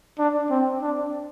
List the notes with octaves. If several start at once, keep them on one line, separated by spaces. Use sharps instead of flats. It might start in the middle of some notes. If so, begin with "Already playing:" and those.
D4
C4
D4